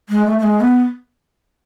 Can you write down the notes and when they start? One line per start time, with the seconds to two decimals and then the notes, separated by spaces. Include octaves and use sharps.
0.09 G#3
0.26 A3
0.39 A3
0.43 G#3
0.60 B3